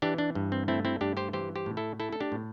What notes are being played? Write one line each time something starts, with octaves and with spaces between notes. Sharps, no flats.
E3 D4 G4
D4
G2
C4
A3 C4 E4
C4 E4
G2 D4 G4
G4 C5
E3 G4 C5
G4 C5
A2
E4 A4
A3 E4 A4
A4
D4 G4
A2